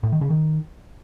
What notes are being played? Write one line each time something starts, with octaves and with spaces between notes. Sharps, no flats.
A2
D#3
C#3
D#3